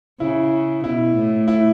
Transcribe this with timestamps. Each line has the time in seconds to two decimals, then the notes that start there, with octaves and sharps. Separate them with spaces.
0.20 C#3 E4
0.84 B2 E4
1.16 A2
1.48 E4